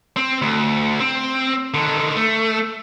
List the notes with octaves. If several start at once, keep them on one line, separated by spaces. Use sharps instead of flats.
C4
D2
C4
D3 D#3
A3